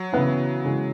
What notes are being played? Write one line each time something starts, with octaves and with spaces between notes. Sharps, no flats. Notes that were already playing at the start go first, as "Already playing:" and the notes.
Already playing: F#3
C#3 E3 B3 E4
C#3 E3 G#3